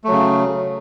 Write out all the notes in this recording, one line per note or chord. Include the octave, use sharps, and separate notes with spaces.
C#3 F#3 A3